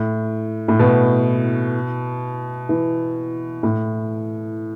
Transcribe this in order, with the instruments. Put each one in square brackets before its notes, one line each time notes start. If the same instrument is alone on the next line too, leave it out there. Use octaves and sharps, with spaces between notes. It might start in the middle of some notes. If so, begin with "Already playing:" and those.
Already playing: [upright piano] A2
A2
B2
E3
A2